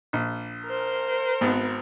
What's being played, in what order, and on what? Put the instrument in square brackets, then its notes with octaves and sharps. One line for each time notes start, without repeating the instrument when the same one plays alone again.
[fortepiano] A#1
[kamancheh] A#4 C5
[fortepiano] G#1 B3